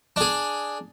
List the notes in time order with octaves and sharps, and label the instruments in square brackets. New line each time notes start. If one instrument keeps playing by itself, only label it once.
[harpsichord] D4 G#4